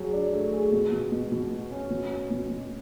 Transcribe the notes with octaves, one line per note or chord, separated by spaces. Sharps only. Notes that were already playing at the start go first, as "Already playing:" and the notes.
Already playing: F#3 G#4
D4
A3
G#4
B2
B2
B2
B2
F#4
C#4
B2
C#4
B2
B2